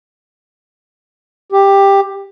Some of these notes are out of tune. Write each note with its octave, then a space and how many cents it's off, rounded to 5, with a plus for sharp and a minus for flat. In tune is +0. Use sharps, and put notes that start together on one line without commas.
G4 +10